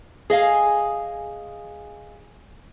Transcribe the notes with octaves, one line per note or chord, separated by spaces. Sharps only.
G#4 D#5 F5 G#5